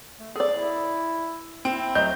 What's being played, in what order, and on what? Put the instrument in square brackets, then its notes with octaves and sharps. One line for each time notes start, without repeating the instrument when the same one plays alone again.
[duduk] A3
[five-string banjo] G#4 D5 [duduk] A4
[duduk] E4
[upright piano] C4 [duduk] E4
[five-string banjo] F#3 D#5 [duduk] A3 [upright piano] G6